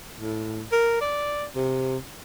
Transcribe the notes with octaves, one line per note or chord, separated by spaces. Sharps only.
A2
A#4
D5
C3